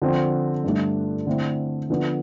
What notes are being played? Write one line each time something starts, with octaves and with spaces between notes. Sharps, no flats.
D3 F3 C4
G2 D3 A3 D4
D3 A3 C4 E4
D3 F3 B3 D4